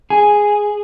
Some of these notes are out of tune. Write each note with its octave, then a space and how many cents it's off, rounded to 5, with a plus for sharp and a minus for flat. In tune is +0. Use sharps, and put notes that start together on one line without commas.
G#4 +0 G#5 +0